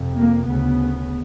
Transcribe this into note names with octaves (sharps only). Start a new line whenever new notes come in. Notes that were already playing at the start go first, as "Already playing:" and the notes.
Already playing: F2 C3
A#3
D2 C#3 B3